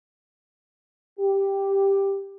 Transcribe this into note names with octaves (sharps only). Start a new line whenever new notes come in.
G4